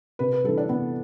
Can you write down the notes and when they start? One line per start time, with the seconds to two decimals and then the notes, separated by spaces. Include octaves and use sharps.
0.19 C3 B4
0.33 B4
0.44 E3 G3 A4
0.58 D4
0.69 C3 B3